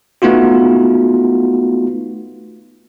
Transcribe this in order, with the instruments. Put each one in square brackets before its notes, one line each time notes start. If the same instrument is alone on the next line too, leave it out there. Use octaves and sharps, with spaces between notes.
[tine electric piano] A3 B3 D#4 F4 F#4